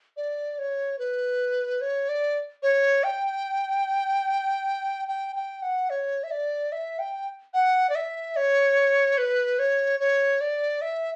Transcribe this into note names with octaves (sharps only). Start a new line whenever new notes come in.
D5
C#5
B4
C#5
D5
C#5
G5
G5
G5
F#5
C#5
E5
D5
E5
G5
F#5
D5
E5
C#5
B4
C#5
C#5
D5
E5